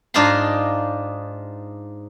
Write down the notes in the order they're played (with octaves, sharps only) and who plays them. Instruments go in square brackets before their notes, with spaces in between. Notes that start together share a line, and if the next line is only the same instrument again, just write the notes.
[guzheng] G#2 D4 D#4 F4 A#5 C6